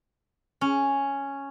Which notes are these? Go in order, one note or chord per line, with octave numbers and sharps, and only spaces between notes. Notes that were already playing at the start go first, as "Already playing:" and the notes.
C#4